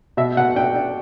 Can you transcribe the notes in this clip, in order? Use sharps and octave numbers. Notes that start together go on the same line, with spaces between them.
B2 E5
B2 F#5
D4 G5
D4